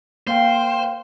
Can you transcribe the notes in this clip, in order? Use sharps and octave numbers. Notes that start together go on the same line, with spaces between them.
A#3 C5 F5 G5